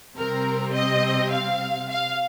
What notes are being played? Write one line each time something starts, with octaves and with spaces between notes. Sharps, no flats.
C3 G3 C4 A#4
D#5
F5
F5